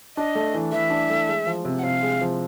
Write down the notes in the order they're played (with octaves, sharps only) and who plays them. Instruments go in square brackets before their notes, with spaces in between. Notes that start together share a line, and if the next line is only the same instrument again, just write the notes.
[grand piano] D4 [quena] D#5
[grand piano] A3
E3
[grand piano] E3 [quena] E5
[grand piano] D4
A3
G#3
F3
C3
[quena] F#5
[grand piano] C3 [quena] F5
[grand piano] G#3
F3